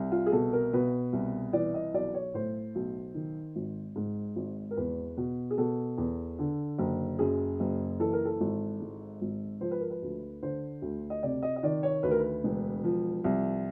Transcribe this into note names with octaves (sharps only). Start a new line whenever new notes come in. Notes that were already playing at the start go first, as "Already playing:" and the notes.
Already playing: C2
F4
G#4
B2 A4
A#4
B2 B4
C2
E3 D5
D#5
B1 D5
C#5
A2 C5
B1
D#3
G#1
G#2
G#1
A#4
E2 B4
B2
G#4
B2 A4
E2
D3
F#1
F#2 G#4
F#1
E3 A4
A#4
A4
G#1
G#2
G#1
F3 C5
B4
A#4
B4
D2
D3 C5
D2
D#5
C3 D5
D#5
D#5
D#3 D5
C#5
D2 B4
A#4
B4
E1
F3
C2